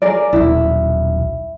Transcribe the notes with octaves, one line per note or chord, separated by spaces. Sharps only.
G#4 A#4 D5
D#1 B1 E4